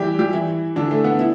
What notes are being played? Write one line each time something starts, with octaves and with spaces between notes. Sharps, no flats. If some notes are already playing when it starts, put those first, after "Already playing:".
Already playing: E3 G3 E4 G4
G3 G4
E3 E4
D3 D4
A3
B3
E4